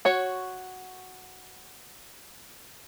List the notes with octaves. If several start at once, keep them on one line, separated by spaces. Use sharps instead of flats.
F#4 C#5